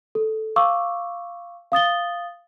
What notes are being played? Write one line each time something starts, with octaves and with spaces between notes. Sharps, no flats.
A4
F5 C#6 D6 E6
F5 D#6 A6 G7